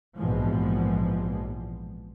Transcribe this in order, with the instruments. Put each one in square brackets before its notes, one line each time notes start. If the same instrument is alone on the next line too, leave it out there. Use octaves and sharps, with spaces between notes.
[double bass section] A#1 G#2 B2 E3 F3 G#3